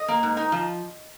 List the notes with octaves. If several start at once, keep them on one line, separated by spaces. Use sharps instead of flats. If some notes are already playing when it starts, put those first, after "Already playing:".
Already playing: D#5
A#3
G#2
D#4
F3